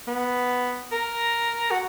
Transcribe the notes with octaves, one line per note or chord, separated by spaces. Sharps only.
B3
A#4
F#4